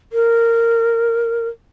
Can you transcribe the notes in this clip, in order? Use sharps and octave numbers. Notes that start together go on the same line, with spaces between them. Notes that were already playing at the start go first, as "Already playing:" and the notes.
A#4